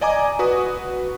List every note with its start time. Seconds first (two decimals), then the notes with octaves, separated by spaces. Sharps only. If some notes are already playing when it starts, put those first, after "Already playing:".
0.01 D5 D#5 G#5 A#5 D6
0.39 F#4 B4 D#6